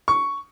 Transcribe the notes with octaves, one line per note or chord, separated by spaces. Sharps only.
C#6